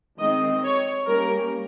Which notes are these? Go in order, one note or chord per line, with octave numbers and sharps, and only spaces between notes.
D#3 G#3 C4 D#5
C#5
G3 A#3 C#4 A#4